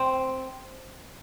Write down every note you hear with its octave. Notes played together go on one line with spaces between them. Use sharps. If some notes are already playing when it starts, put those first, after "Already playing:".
Already playing: C4